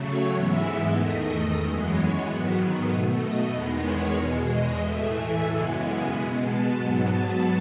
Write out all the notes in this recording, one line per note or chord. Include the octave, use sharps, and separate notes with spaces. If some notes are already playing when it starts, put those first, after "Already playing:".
Already playing: C#3 F#3 A3 C#5
G#2 E3 G#3 B3 E5
E2 D#3 A3 D#5
F#2 E3 G#3 B3
C#5
G#2 D#3 F#3 B3
B2 A3 D#5
D#5
E2 D#3 G#3 B3
C#5
E2 B2 G#3
D#5
A2 E3 A3 E5
G#5
F#2 C#3 E3 G#3 B3
G#5
B2 G#3 B3
A5
G#2 F#3 B3 A5
A5